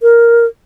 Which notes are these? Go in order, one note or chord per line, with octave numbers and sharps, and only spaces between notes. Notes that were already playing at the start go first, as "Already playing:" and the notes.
A#4